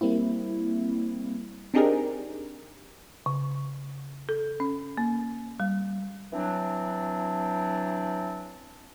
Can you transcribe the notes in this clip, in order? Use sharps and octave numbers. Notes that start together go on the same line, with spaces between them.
G3 A#3 C4 E4
C4 D4 D#4 G4 G#4 A#4
C#3
A4
C#4
A#3
G3
E3 F#3 C4 D4